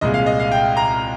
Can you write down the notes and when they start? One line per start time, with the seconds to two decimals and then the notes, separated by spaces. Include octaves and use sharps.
0.01 C2 A#2 G#3 D#5
0.14 F5
0.26 D#5
0.40 F5
0.52 G5
0.77 A#5